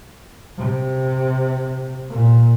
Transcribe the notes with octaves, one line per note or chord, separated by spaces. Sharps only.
C3
A#2